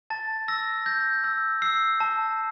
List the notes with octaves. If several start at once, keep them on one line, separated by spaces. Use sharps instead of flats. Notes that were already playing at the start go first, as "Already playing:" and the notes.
A5 A6
E6 A#6
G6 A#6
E6
E6 C7
A5